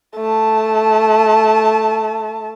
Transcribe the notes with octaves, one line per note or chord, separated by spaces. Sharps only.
A3 A5